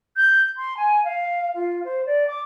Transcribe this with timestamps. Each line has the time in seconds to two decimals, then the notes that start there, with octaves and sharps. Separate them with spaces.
0.16 G6
0.57 C6
0.77 G#5
1.04 F5
1.54 F4
1.84 C5
2.06 D5
2.27 D6